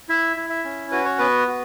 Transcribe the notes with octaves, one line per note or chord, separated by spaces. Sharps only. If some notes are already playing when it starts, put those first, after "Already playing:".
E4 E5
E4
E5
C#4
F#4 B4
C#5
B3 B4
F#4